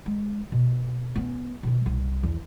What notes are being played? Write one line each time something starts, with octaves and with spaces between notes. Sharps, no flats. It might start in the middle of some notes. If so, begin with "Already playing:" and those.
G#3
B2
B3 C#4
B2 D#3
C2
E2